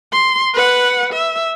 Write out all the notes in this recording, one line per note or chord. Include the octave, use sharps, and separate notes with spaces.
C6
B4 F#5
E5